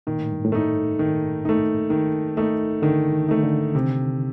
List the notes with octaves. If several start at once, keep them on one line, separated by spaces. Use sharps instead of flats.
A#2 D#3
A2
G2
A2
A3 D#4
D#3
A3 D#4
D#3
A3 D#4
D3 D#3
D#3
A3 D#4
D3
C3